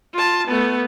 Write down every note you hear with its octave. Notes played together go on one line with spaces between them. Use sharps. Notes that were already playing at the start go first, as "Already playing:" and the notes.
F4 A5
A3 B3